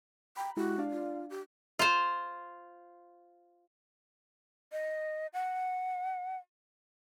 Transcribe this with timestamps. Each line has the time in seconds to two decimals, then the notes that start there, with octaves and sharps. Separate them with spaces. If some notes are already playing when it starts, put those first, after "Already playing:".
0.37 G5 A#5 B5
0.57 G#3 E4 F#4 G4
0.78 D4 D5 F5
0.90 F4
1.30 G4
1.79 F4 C5
4.72 D#5
5.34 F#5